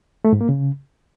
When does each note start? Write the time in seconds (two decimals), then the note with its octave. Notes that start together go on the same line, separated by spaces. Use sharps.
0.25 A3
0.33 G#2
0.41 A#3
0.49 C#3